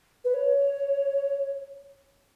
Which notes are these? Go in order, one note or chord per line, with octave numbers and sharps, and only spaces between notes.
B4
C#5